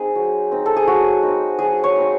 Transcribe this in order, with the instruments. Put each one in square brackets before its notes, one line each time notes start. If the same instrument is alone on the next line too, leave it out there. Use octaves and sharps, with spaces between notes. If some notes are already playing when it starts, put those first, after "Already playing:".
Already playing: [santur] C4 D#4 G#4
F#3
C4 D#4
A4
G#4
F#3 F#4
C4 D#4
F#3 G#4
C#5
C4 D#4